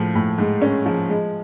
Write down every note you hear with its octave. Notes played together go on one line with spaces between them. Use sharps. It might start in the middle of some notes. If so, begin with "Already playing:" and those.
Already playing: A2 F3
A2
G#2
C#4
F3
G#3